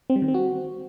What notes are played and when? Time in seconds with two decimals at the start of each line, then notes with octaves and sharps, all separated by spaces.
0.10 C4
0.16 G3
0.22 D#3
0.28 C4
0.34 F#4